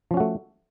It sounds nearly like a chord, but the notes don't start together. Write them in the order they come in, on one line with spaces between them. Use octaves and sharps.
F3 C#4 F#4 A3